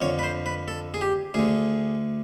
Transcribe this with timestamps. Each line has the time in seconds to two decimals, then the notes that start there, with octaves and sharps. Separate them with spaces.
0.01 F2 D3 C#5
0.19 B4
0.23 C5
0.46 B4
0.68 A4
0.94 G#4
1.01 G4
1.34 D2 D3 G#4